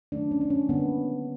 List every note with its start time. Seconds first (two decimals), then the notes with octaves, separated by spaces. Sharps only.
0.12 D#3 F#3 A3 D4
0.31 C#4
0.41 D4
0.50 C#4
0.69 D3 G3 A#3 B3